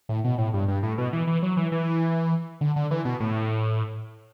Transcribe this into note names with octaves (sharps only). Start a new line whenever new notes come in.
A2
B2
A2
G2
G2
A2
B2
E3
E3
F#3
E3
E3
D3
D3
E3
B2
A2